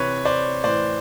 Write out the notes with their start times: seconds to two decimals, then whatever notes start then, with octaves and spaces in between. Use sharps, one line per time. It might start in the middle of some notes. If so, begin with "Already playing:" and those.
Already playing: C3 E3 B4 C#5
0.25 C5 D5
0.64 A2 E3 C5 D5